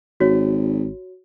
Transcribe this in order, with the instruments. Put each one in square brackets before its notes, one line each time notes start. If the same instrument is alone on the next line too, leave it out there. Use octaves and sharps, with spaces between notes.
[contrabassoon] G#1 [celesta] F#4 C#5